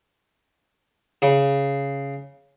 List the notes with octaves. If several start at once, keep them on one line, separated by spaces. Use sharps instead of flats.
C#3